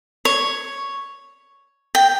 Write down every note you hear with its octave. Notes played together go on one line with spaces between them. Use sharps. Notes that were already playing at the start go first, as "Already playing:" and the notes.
C#5
G5